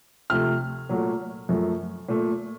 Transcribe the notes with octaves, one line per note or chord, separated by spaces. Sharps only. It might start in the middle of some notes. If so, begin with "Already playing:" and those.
C3 F3 A3 F6
A#2 F#3 A3
F#2 F3 A3
A#2 A3